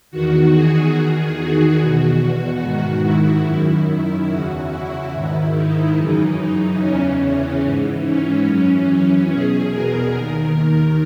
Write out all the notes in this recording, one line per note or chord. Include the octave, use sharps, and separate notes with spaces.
E2 D#3 F#4
G#4
E2 D#3
F#4
E2 B2
G#2 D#3
E4
F#2 D#3
E2 C#3 E3 F#4
E4
G#2 D#3 E4
D#4
F#2 C#3 E3
E2 C#3 E3 C#4
G#2 E3
C#4
F#2 E3
E2 B2 G#4
A#4
D#2 D#3